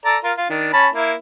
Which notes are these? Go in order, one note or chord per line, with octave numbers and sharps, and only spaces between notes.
A4 D5 A#5
F4 A#4
F4
D#3 D4
C#4 A5 B5
A#3 E4